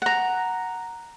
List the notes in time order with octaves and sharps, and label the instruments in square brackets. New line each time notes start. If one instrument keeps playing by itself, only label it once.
[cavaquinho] F#5 A#5